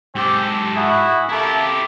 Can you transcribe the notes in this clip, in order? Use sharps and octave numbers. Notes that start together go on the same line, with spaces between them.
G#2 C4 G4 A4
E4 F#4 G#4
A3 A#3 E4 G4 A4